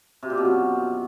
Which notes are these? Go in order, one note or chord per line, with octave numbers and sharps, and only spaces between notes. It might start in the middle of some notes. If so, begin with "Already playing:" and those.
C3
A#2
B2
F#2